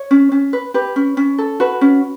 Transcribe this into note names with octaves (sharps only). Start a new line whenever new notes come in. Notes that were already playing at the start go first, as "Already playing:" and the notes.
Already playing: C#5
C#4
C#4
B4
G4 B4
C#4
C#4
A4
F#4 B4
C#4